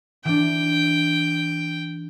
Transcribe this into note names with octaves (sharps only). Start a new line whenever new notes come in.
E3 D4 G5